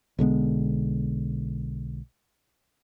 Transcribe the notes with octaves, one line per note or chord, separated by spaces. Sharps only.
B1 D3 G#3 B3